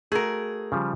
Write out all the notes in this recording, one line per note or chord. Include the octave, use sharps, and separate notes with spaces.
A3 F#4 G#4 A#4
C#3 F3 G3